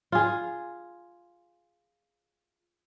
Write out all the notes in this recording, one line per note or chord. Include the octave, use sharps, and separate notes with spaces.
F4 G#4